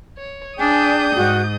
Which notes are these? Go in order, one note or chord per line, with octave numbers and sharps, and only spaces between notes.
C#5
D4 G#4 D5 G5 G#5 D#6 G6
G#2 F#4